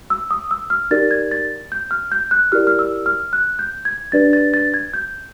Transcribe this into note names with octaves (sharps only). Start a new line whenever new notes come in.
E6
D#6
E6
F6
D#4 G4 A#4 D5 A6
G#6
A6
G6
F6
G6
F#6
E4 G4 A#4 D5 F6
F6
E6
F6
F#6
G6
G#6
D4 G4 B4 D5 A6
A6
A6
G#6
G6